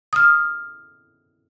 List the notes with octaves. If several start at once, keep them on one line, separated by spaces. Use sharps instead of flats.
D#6 F6